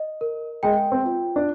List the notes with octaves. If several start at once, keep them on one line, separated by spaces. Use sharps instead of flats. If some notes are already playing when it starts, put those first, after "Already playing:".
Already playing: D#5
A#4
G#3 G5
C4
F4
D4